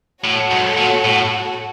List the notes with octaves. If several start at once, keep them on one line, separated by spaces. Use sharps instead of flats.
A2 F#4 A4 C#5 F#5
G#2
A#2
A2